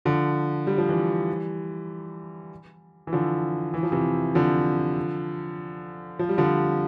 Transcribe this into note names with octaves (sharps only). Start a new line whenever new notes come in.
D3 F3
G3
F3
E3 G3
E3
D3 F3
E3
F3
C3 E3
D3 F3
F3
G3
D3 F3